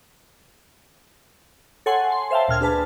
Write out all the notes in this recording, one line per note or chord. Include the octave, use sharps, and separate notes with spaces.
A4 C#5 F#5 G#5 C6
A5 C6
C5 E5 F5 G5 A5
D2 A#2 A5 F6 G#6
D4 G#4 B4 A5